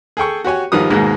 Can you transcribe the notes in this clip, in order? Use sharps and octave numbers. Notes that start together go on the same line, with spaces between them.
G#4 A4 G5 C#6
F#4 G4 C#5 G#5
G#1 D#3 F3 G3 D#6
D#2 G#2 B2 G#3 A#3